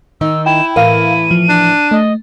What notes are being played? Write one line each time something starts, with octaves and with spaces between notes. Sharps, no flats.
D#3 D#4 E6
E4 G5 E7
A2 E3 A#4 F5 D#7
F3
D4
A3 D#5